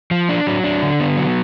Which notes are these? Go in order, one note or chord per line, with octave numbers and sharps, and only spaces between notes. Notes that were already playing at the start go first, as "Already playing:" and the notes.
F3
D4
F#3
D4
D3
B3
F#3